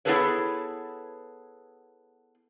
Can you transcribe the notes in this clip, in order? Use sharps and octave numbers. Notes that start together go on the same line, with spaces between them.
B3 E4 G#4 A4 B4 C#5